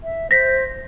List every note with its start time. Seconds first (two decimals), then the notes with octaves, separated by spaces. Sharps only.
0.04 E5
0.31 C5 A#6 B6